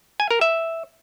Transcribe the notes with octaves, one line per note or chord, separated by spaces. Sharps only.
G#5
A#4
E5